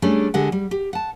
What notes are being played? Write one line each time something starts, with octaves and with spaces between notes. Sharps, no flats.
G3 A3 C#4 D4 G#4
D3 G#3 G4 F#5
G3
G4
F#5 A5